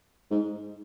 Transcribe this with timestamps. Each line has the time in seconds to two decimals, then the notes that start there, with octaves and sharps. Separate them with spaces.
0.31 G#2